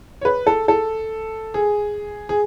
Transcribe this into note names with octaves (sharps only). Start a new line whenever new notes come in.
C#5
B4
A4
A4
G#4
G#4